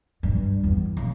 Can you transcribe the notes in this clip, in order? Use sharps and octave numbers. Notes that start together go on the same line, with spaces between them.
G2
E2
C#3